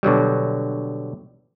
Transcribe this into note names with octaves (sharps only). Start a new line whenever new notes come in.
B2 D3 F#3 G3